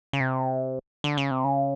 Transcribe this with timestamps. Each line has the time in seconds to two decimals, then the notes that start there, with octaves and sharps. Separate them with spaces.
0.13 C#3
0.20 C3
1.04 D3
1.17 C#3
1.31 C3
1.44 C#3